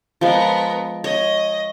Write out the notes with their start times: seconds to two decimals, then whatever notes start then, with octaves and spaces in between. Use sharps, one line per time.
0.21 F3 G#3 B3 A#4
1.04 C#5 D#5